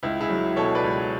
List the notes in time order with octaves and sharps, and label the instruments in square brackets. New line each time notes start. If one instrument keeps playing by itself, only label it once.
[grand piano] C#2 E4
E4 G#4
F#3
B2 A4 C#5
B4 D5
C#2